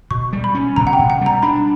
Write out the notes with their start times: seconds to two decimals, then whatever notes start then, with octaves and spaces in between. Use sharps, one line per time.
0.11 B2 C#6
0.33 G3
0.44 B5
0.55 C#4
0.76 B2 A#5
0.87 F#5
0.93 G5
0.99 B2
1.10 F#5
1.21 G3
1.26 A#5
1.43 D4 B5